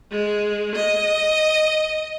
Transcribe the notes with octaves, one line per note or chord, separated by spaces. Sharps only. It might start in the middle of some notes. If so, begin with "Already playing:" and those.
G#3
D#5